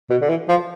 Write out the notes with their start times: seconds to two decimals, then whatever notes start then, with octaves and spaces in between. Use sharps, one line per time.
0.10 B2
0.21 D3
0.29 E3
0.49 F3